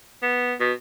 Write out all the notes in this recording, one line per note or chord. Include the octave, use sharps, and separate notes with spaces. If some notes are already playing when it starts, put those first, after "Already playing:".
B3
B2